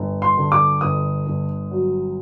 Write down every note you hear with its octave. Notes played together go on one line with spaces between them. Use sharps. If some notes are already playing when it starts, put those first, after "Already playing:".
Already playing: G1
C6
D3
D6
G1 D#6
G1
F#3